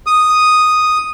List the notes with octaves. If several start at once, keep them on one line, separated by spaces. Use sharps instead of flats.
D#6